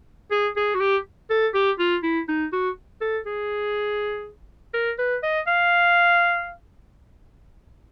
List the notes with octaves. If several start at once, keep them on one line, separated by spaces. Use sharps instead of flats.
G#4
G#4
F#4
G4
A4
G4
F4
E4
D#4
F#4
A4
G#4
A#4
B4
D#5
F5